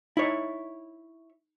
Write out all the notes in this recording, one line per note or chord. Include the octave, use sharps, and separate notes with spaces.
D#4 E4 C#5